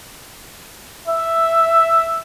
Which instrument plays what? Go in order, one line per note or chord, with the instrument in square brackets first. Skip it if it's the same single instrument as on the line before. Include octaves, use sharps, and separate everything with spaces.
[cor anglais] E5